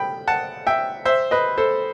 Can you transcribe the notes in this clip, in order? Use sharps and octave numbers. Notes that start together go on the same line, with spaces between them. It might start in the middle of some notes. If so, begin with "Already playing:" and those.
Already playing: G5 B5
F#5 A5
E5 G5
C5 E5
B4 D#5
A4 C5